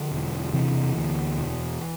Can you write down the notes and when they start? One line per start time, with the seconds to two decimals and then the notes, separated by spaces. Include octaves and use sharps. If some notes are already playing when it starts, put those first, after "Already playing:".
Already playing: D3 F3
0.11 E1
0.53 C3 E3
0.96 D2
1.38 E1